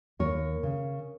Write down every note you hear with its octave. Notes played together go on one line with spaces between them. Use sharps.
D#2 A#4 C#5
C#3